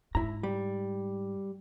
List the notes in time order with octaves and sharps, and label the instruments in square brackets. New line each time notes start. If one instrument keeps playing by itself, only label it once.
[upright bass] G#2 [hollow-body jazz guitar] E4 A#5
[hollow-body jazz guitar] G3